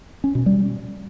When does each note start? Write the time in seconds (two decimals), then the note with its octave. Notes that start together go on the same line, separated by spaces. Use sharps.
0.24 C#4
0.35 B2
0.46 G3